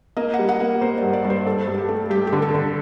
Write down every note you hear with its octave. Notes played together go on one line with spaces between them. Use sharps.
A#3 D#5
F#5
G3
F#5
A#3
A#3 C5
G2 D5
D5
G2 C5
G2 A4
G2
G4
A3
G2 G4
G4
D3
A4
D3